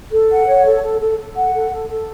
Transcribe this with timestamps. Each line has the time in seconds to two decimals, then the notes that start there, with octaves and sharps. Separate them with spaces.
0.12 A4
0.30 F#5
0.47 C#5
0.65 A4
0.83 A4
1.00 A4
1.18 A4
1.36 F#5
1.53 A4
1.71 A4
1.89 A4